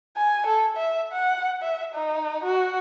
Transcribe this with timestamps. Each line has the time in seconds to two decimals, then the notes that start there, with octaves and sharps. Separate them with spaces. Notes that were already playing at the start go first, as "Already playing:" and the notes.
0.17 G#5
0.46 A4
0.77 E5
1.12 F#5
1.62 E5
1.94 D#4
2.44 F#4